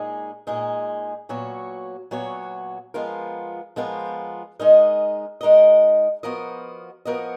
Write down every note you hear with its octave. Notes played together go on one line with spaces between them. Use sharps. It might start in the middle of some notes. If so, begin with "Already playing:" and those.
Already playing: A#2 G#3 D#4 G#4
A#2 G#3 D#4 G#4
A#2 F#3 B3 F#4 C#5
A#2 F#3 B3 F#4 C#5
F3 G#3 B3 F4 A#4
F3 G#3 B3 F4 A#4
G#3 D#4 A#4 D#5
G#3 D#4 A#4 D#5
F3 B3 F#4 A#4 D#5
F3 B3 F#4 A#4 D#5